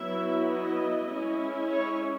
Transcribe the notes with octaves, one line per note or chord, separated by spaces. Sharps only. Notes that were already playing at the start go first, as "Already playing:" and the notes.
Already playing: F#3 B3 E4 E5
D#5
G#3 C#4 E4
C#5